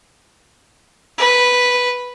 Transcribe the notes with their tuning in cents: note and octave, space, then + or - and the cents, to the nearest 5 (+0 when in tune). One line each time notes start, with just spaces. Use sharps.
B4 -5